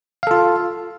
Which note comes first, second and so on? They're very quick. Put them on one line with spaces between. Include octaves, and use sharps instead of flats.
F5 A4 F4